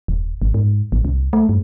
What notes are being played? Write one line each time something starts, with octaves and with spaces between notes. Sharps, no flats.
D#1
G#1
G#2
A1
C2
A3
G2